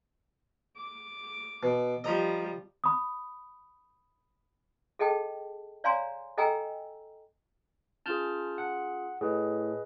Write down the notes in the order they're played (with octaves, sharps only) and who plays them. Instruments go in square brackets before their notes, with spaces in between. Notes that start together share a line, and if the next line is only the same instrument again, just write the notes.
[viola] D6
[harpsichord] B2
[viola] F3 G3 [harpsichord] D#5 A#5 B5
[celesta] B5 D#6
[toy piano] G#4 A4 D#5 G5 A5
C#5 D5 F5 G#5 A#5 C6
A4 D#5 G5 G#5 A#5 E6
[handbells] C#4 F4 G#4 [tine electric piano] A5 F6 G6
[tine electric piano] F#5
[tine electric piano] A2 [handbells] G#4 B4 D#5